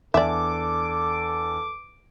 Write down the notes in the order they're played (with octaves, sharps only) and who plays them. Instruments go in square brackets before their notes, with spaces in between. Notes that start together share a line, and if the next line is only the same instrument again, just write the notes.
[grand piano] E2 D4 G#5 [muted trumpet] A4 [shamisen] D5 E5 [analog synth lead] D6